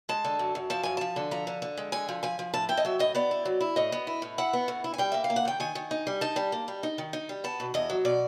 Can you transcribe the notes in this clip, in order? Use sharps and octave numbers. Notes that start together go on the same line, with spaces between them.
G#3 A5
D3
F#2
F#2
F3 A5
F#2 G#5
F3 A5
D3
F3 A#5
D3
D3
G#3
D3 G#5
F3
F3 G#5
F3
A2 A5
E4 G5
D#5
F#3 E5
A2 D#5
B3 D5
E4
F#3
E4
A2 D#5
B3
E4
A2
E4 F#5
B3
A2
E4
G#5
G3 G5
A#3 E5
F5
A#3
F#5
D#3 G5
D#3 G#5
D#3
D#4
G3
D#4 A5
G3
A#3
G3
D#4
D#3
D#4
G3
B3 A5
B2
E2 D#5
F#3
B2 D5